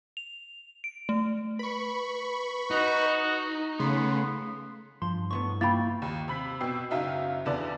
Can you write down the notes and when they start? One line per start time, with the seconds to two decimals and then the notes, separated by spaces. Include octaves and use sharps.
0.17 F7
0.84 D7
1.09 A3
1.59 B4 B5 C#6
2.71 D#4 F#4
3.80 C#3 A3 B3 C6
5.02 G2 F3 C6
5.31 C2 A2 B3 C#6
5.61 A#3 E4 F4 G5 B5 A6
6.02 D#2
6.28 C3 B5 B6
6.60 B2 G5 E6 C7
6.90 F#1 F#3 D#4 E5 F5 G5
7.46 E2 D3 B4 D5 A5